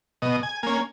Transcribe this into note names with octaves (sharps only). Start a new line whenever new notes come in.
B2 D#5
G#5
A#3 C#4 G#5